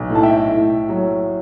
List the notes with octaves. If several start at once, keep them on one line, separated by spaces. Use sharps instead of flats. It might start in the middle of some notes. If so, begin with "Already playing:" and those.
Already playing: B1
A2
A5
E5 G5
A2
F#3